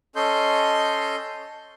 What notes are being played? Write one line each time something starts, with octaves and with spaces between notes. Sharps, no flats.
C#4 A4 D#5 C6 G6